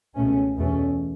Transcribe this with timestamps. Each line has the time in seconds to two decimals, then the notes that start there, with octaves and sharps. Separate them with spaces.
0.15 C#2 B2 A3 C#4
0.57 E2 B2 A3 C#4